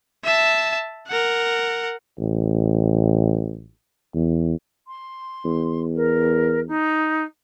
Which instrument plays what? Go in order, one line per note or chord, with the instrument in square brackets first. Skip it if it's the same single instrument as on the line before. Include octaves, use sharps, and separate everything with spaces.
[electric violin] E5 A5
A#4 F#5
[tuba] A1
E2
[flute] C6
[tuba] E2
[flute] A#4
D#4